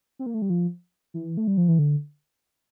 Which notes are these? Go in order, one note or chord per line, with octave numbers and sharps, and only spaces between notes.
C4
A#3
A3
G3
F3
E3
A3
G3
F3
E3
D3